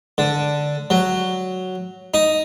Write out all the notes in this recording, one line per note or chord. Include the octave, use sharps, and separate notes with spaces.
D3
F#3
D#4